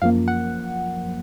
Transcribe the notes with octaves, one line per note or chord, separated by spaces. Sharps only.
F#2 F3 A#3 F5
F#5